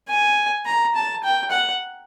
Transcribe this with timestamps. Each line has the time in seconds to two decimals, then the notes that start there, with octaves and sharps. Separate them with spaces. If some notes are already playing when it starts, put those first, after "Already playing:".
0.09 G#5
0.66 A#5
0.95 A5
1.24 G5
1.51 F#5